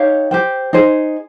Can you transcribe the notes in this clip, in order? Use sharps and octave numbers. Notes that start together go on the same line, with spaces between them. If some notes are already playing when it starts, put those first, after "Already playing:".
Already playing: D#4 G4 C#5 F5
G4 C5 G5
D#4 G#4 C5